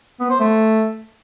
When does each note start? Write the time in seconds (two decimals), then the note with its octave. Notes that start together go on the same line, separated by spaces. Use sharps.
0.20 B3
0.30 C5
0.40 A3